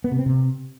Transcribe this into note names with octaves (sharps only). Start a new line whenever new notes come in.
B3
C3
C4
C3